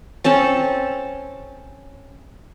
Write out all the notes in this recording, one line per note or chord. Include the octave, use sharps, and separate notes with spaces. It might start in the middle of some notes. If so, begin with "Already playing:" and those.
C4 C#4 A4 A5